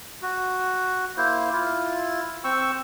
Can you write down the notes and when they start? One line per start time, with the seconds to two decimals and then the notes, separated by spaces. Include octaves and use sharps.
0.22 F#4
1.17 A#3 E4 C5
1.52 E4 F4
2.44 C4 G5 C#6 E6